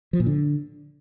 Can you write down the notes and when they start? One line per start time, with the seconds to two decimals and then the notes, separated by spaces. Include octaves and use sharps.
0.13 F3
0.20 A#2
0.26 D3